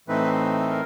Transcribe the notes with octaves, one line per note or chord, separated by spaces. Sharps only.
A2 E3 A3 C4 D#4 B4
A#4